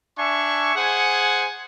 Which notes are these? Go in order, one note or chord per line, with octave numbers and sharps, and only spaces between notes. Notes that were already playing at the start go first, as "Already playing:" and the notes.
D4 E5 G#5 C#6
G#4 C5 F#5 G#5